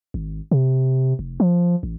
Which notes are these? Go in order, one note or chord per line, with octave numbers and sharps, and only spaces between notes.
G#1
C3
F1
F3
A1